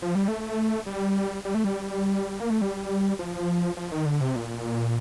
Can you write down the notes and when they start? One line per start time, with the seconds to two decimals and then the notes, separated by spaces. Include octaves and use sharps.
0.02 F3
0.15 G3
0.28 A3
0.86 G3
1.45 G3
1.55 A3
1.64 G3
2.40 A#3
2.50 A3
2.61 G3
3.19 F3
3.77 F3
3.92 D#3
4.06 D3
4.21 C3
4.36 A#2